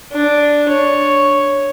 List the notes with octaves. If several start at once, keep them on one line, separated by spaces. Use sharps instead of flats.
D4
C#5